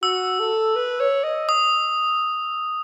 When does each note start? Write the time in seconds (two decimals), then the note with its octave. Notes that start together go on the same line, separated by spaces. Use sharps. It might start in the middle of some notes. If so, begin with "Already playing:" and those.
0.03 F#4 E6
0.39 A4
0.76 B4
1.00 C#5
1.24 D#5
1.49 D#6